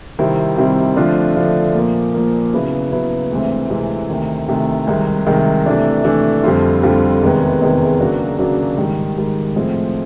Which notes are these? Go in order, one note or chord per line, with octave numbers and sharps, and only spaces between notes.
C3 D#3 G3 C4 E4
C3 D#3 G3 C4 E4
D3 F3 A3 D4 F4
D3 F3 A3 D4 F4
A#2 F3 A#3
A#2 F3 A#3
C#3 F#3 B3 E4
C#3 F#3 B3 E4
D2 C3 E3 G#3 C4
D2 C3 E3 G#3 C4
D2 C3 D#3
D2 C3 D#3
C2 C3 D#3 G#3
C2 C3 D#3 G#3
C3 E3 A3 D4
C3 E3 A3 D4
F2 D3 G3 C4 F4
F2 D3 G3 C4 F4
E2 C3 D#3 G#3 B3
E2 C3 D#3 G#3 B3
C#3 F#3 A#3 D4 F#4
C#3 F#3 A#3 D4 F#4
G#2 D#3 G3
G#2 D#3 G3
A2 F3 G#3 C4